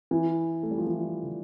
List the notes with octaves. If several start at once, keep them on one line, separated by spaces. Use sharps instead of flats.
E3
A3
G3
F3
E3
D3